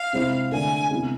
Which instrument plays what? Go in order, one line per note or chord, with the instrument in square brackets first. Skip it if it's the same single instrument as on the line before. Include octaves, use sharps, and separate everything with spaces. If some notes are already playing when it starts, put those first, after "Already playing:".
Already playing: [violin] F5
[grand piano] C3 G#3 C4 E4
[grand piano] D3 A3 D4 [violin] G#5
[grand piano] C3 G#3 B3 E4